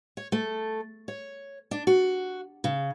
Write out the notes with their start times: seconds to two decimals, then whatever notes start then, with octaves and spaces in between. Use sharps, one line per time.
0.17 C#5
0.32 A3
1.08 C#5
1.71 D4
1.87 F#4
2.64 C#3